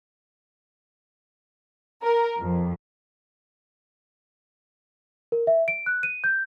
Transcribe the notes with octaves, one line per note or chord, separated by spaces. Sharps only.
A#4
F2
A#4
E5
D7
F#6
D#7
G6